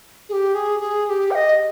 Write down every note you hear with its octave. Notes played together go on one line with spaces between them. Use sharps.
G#4
G4
G#4
G#4
G#4
G4
G5
D#5